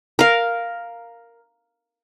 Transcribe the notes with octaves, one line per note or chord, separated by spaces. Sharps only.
A#4 F5